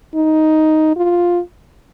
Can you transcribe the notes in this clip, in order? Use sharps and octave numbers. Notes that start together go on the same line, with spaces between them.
D#4
F4